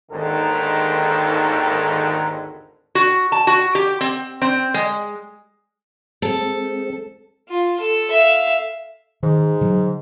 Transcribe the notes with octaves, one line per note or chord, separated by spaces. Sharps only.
G#1 D#2 G#2 D3 D#3 A4
F#4
A5
F#4
G4
C4
C4
G#3
G#3 C4 A4
F4
A4
E5 F5
G#2 D#3
D3 F#3